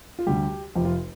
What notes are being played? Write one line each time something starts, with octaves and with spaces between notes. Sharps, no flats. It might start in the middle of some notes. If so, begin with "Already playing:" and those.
F4
D2 D3 G3 G4
F1 F2 C3 F3 G4
F4